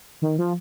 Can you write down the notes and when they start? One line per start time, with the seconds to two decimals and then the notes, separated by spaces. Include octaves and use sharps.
0.22 D#3
0.38 F3